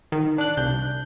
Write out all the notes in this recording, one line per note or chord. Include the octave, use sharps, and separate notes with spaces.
D#3
D4 F#6
C2 G6